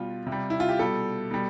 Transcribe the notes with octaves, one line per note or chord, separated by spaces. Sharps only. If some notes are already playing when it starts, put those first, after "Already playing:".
Already playing: B2 G3 F4
C3
G3
E4
F4
G4
B2 G3 A4
B2 G3